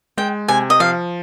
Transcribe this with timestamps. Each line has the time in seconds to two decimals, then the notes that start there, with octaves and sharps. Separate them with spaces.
0.17 G#3 G5
0.48 C3 G#5
0.70 D#5
0.80 F3 F5